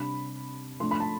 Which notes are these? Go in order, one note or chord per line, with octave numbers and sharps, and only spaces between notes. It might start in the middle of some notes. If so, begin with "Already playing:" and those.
Already playing: C3 G3 D4 B5
F3 A3 D4 C6
B5
A5